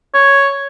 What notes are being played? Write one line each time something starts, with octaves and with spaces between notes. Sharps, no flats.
C#5